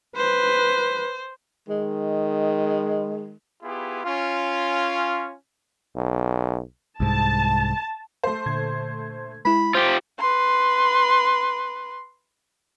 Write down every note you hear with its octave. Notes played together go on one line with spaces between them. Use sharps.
B4 C5
D#3 G#3
B3 E4 F4 G4 G#4
C#4 F4
B1
C2 G#2 A5
A3 C5
A#2 D3 G#6
G#3 E4 B5
F4 G4 C5
B4 C6